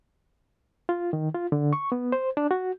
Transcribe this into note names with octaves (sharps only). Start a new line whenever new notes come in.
F4
D#3
F4
D3
C#6
B3
C5
D4
F#4